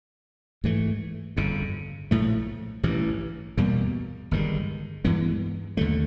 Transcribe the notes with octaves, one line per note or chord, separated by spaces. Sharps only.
G#2 E3 A3
G1 F2 C#3
A#1 A2 F3 A3
A1 G2 E3
E2 B2 G3 A#3
G1 G2 D#3 G#3
G2 E3 G#3 B3
D#2 D3 F#3 A3